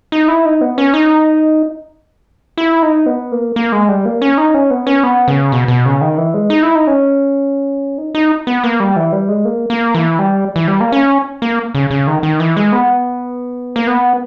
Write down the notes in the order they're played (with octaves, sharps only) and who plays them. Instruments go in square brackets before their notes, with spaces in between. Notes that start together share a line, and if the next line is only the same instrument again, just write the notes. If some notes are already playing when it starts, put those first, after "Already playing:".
[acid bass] D#4
E4
D#4
B3
C#4
D#4
E4
D#4
B3
A#3
A#3
G#3
G3
A#3
C#4
D#4
C#4
B3
C#4
B3
C#3
B2
B2
C#3
D#3
E3
G#3
D#4
E4
D#4
C#4
D#4
D#4
B3
A#3
G3
E3
G3
G#3
A#3
A#3
E3
G3
E3
G3
A#3
C#4
A#3
C#3
C#3
D#3
D#3
E3
G#3
B3
A#3
B3